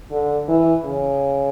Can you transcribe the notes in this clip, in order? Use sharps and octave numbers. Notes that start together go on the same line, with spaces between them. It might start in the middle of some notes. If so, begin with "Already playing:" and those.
D3
E3
C#3